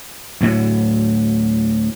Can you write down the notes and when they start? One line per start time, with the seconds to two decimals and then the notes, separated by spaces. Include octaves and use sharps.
0.41 D2 A2 F#3